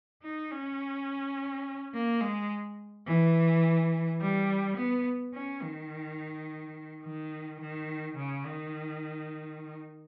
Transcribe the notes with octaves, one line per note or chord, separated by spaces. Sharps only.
D#4
C#4
A#3
G#3
E3
G3
B3
C#4
D#3
D#3
D#3
C#3
D#3